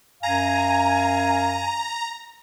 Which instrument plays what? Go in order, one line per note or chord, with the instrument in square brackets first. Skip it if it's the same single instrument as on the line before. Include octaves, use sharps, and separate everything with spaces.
[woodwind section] F#2 F5 G#5 [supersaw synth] A#5